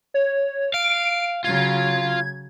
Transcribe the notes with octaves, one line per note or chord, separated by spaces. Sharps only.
C#5
F5 D7
C#3 F#3 F4 G#6